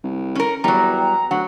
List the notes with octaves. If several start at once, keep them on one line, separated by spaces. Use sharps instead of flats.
C2
C#4 A#4
E2 F#3 G3 A#5
D2 F#3 F#5